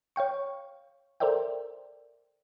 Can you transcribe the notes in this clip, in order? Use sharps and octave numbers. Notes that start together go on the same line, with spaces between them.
C#5 F5 G5 C#6
A4 A#4 C5 D5 E5 G5